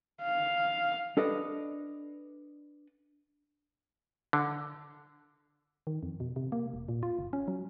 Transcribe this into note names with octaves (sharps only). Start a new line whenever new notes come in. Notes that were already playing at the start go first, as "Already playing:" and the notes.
F5
D4 A4 B4 D#5
D3
D#3
F2
B2
C3
A#3
E1
A#2
F4
F#1
C#4
F#3